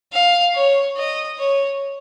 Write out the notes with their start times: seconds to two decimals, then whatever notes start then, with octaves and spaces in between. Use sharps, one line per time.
0.13 F5
0.55 C#5
0.97 D#5
1.38 C#5